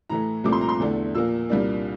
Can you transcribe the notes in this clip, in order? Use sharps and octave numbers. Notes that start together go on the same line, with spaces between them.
A2 E3 A3 A#5
C2 A#2 F3 A3 C4 D6
C6
A#5
C6
E2 D3 A3
A#2 F3 A#3 E6
C2 A#2 G3 A#3 D4